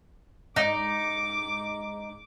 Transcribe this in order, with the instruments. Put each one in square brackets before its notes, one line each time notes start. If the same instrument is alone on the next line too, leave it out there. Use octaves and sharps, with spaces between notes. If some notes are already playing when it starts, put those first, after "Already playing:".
[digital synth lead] G#2 [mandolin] D#4 [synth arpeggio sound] D5 D#5 [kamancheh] D6